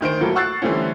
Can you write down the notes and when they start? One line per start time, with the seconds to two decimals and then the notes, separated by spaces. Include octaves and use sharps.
0.01 D2 D#3 C5 D7
0.20 F1 A2 F#3 A#3 A4
0.35 F#5 C#6 E6 F#6 A6 C7
0.62 D3 E3 G3 A3 C4 C#4